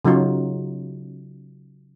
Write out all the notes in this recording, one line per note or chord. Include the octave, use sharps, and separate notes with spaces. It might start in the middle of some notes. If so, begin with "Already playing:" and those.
C#3 F#3 D#4 F4